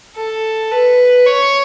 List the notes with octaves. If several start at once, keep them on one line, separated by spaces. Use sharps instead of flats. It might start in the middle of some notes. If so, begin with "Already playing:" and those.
A4
B4
C#5